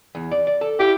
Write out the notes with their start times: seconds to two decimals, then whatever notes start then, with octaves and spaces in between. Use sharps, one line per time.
0.15 E2
0.31 D5
0.47 D5
0.61 A4
0.79 E4 G4 F5